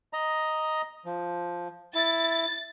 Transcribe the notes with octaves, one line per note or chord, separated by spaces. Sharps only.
D#5 A#5
F3
E4 A6